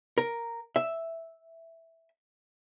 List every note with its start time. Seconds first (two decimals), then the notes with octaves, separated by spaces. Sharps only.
0.18 A#4
0.76 E5